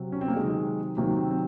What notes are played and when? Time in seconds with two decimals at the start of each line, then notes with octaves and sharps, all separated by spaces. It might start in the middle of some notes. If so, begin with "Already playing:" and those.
Already playing: C3 F#3
0.12 C#4
0.21 C4
0.28 A#3
0.36 C3 D#3 F#3 G#3
0.97 C3 D#3 F#3 A#3
1.17 C4
1.31 C4